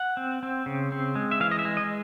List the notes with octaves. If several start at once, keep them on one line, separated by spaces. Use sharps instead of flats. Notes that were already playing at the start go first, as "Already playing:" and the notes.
Already playing: F#5
C4
C4
C#3
C4
G#3
E5
E3 F5
D#5
E5
G#3
D#5